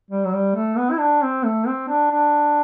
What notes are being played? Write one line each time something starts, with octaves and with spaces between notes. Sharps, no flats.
G3
F#3
G3
A3
B3
E4
D4
C4
A3
C4
D4
D4